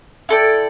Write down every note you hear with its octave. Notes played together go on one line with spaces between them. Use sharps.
E4 A4 D5 G5